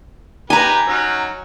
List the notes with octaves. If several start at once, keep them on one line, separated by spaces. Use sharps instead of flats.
D#4 G4 B4 G#5 A#5
F#3 C#4 D#4